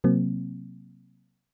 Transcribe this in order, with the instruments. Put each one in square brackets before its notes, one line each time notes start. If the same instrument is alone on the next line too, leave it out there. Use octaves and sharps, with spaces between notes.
[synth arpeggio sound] C3 F#3 A#3 C4